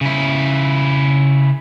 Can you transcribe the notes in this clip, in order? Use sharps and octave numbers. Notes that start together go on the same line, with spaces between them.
C#3 E4